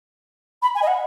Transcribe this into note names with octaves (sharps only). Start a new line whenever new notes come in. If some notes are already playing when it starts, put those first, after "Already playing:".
B5
G#5
D#5
F#5